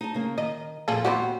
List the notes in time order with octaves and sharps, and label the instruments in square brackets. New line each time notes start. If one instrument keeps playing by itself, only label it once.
[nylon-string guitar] D#4 A5
C#3 A#3
[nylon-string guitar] D#3 [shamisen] D#5
[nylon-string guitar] F2 A#2 [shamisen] F4 G#4 A4
[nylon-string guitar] D#2 F#4 [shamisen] B3 C4 G4